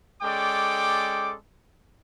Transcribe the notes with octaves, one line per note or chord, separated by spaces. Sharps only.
G#3 C#4 A4 D5 G5 D6